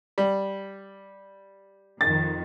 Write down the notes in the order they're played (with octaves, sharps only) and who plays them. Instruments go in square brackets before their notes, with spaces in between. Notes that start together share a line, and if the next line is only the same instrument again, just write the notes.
[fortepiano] G3
[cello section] F2 D#3 [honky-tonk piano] A6